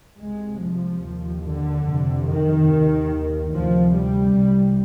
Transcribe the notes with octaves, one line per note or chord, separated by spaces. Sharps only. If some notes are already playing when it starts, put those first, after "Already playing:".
C2 C3 G#3
F3
D#2
D3
F2 C3
D#3
D#2
D2 C3 F3
G3
C2 C3